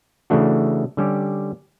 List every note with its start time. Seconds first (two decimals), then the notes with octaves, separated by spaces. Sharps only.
0.30 C#3 E3 A3 D4 F#4
0.97 D3 G3 C#4 G4